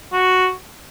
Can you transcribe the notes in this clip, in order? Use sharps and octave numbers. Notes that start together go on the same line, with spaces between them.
F#4